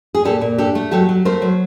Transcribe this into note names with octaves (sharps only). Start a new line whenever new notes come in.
G#4
A#2 G4 A4
A#2
D4 G4 A4
A3
F#3 G4 A4
F#3
A3 A#4 C5
F#3